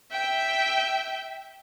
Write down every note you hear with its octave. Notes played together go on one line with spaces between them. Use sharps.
E5 G5